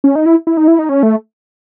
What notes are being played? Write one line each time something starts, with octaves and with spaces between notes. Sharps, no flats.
C#4
D#4
E4
E4
D#4
E4
D#4
C#4
A3